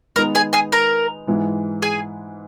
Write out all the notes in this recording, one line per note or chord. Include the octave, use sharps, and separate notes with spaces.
D#3 G#3 B3 D#4 A#4 A#5
G#4 G#5
G#4 G#5
A#4 A#5
G#2 E3 G#3
G#4 G#5